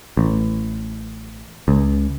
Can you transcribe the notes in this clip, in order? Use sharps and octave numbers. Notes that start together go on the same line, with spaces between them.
A1
C#2